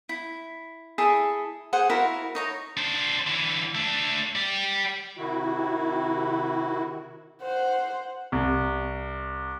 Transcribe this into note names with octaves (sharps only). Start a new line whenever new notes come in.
E4
E4 G#4 A4 A5
G#4 C5 F#5
E4 F#4 A#4 F5
D#4 C#5 A#5
D4 C5
D3 E3
A3 D4
G4 D5
C3 D#3 E4 F#4
C5 F#5
C2